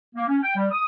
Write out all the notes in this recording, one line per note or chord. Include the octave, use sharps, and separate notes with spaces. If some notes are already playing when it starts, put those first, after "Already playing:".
A#3
C#4
G5
G3
D#6